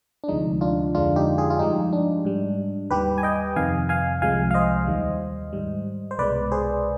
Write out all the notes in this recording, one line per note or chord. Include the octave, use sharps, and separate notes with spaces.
D4
D2 C3 F3 G#3 D#4
D4 F4
F2 D3 G#3 D4 F4
D#4 G4
F4 G#4
F4
G2 F3 G#3 D#4 G4
D4
G#2 G3
D#2 D#3 G3 G4 B4
G#5
D#5 G5
F2 C3 D#3 F5 G#5
F5 G#5
C2 C3 F3 G#3 F5 G#5
F5
C5 D#5
D#2 D#3 G3
G#2 G3
C5
C2 B2 G#3 B4 D5
G#4 C5